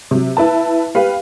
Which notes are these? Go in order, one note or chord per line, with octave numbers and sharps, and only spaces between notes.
C3 F#3
E4 B4 A5
G4 B4 F5